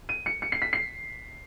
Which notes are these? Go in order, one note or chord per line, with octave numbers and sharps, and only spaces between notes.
D#7
C#7
C#7
C7
B6
C7